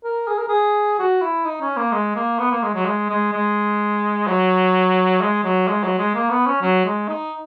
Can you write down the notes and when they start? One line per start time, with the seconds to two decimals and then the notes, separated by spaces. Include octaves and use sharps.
0.04 A#4
0.28 G#4
0.38 A#4
0.48 G#4
0.99 F#4
1.21 E4
1.46 D#4
1.61 C#4
1.77 A#3
1.92 G#3
2.16 A#3
2.39 B3
2.51 A#3
2.62 G#3
2.75 F#3
2.86 G#3
3.10 G#3
3.32 G#3
4.27 F#3
5.21 G#3
5.44 F#3
5.68 G#3
5.83 F#3
5.98 G#3
6.15 A#3
6.30 B3
6.47 C#4
6.62 F#3
6.85 G#3
7.08 D#4